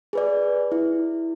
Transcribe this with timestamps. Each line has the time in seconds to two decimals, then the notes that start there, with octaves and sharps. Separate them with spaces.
0.13 G#4 B4 D5
0.72 E4